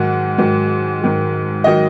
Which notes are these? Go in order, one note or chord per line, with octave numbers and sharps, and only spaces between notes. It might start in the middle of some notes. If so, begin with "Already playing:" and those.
Already playing: G#2 D#3 F#3 F#5
G#2 D#3 F#3
G#2 D#3 F#3
D#3 F#3 D#5